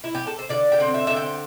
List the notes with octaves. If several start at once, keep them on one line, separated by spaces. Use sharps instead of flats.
E4
G4
A4
C5
D3 D5
G5
C4
E5
D3 E5
G5